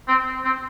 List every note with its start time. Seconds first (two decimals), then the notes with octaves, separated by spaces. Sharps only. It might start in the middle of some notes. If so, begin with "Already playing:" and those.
0.08 C4
0.45 C4